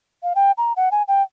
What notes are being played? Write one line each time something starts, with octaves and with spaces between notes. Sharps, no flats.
F5
G5
A#5
F#5
G#5
G5